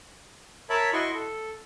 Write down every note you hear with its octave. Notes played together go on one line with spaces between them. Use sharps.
A#4 C#5 E5 A5 B5
E4 F#4 D#5 C6 C#6
A4